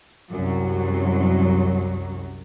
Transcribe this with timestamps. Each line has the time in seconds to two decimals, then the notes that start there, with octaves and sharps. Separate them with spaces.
0.30 C2 F#2 F#3